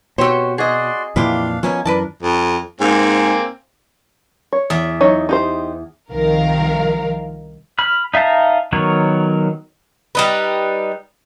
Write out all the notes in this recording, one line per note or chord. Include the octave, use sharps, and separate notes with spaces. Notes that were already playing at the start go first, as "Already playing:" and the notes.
B2 C4 F#4 G4 C5 C#5
F#4 G#4 D5 D#5 C6
F2 A#2 E3 D4 E4 F4 G4 F5
B2 F3 A#3 B3 C#4 G#5
F#2 E3 D4 A#4 B4 D5 A5
F2
G#2 A#3 C4 G#5
C#5
E2 E5
F#3 D#4 C#5
D#4 G4 C5
C2 D#3 F3 A#4 F5
B5 F6
D#4 E5 F5 A5 A#5
D#3 F#3 B3 A#4 C#5
G3 D#4 B4